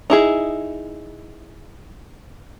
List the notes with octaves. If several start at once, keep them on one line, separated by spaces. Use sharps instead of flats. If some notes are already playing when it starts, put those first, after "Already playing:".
D#4 E4 G#4